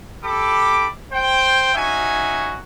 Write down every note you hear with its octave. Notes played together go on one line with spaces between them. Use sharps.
G4 A4 B5 D6
C5 G5
C#4 D#4 F#4 E5 G#5